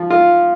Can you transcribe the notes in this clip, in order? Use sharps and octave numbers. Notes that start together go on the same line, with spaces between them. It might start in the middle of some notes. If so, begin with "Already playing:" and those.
Already playing: F3
F4